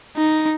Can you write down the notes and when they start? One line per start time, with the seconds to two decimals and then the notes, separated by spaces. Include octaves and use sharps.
0.17 D#4